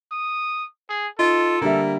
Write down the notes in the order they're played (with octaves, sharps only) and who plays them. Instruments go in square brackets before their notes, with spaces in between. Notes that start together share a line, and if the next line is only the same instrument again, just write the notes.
[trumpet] D#6
G#4
[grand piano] D#4 [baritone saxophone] F4 [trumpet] A4
[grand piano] D3 G3 E5 [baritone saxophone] A#3